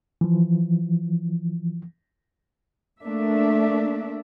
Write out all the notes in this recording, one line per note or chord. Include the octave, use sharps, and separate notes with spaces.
E3 F3
A3 A#3 D4 E5